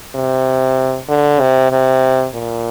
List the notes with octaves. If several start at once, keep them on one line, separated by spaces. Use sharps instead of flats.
C3
D3
C3
C3
A#2